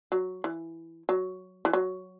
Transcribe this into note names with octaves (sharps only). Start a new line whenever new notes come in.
F#3
E3
F#3
E3
F#3